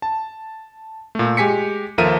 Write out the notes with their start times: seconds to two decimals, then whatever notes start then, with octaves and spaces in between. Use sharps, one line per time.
0.02 A5
1.15 A#2 A3
1.37 G#3 G4 G#5 B6 C#7
1.98 D#2 F3 A4 A#4 E5 D#7